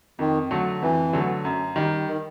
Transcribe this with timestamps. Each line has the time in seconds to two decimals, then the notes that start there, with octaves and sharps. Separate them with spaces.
0.19 F2 D#3
0.51 D3 F#3 A3
0.82 F2 E3
1.13 D3 F#3 A3
1.45 F#2
1.76 D#3 G3
2.08 D#3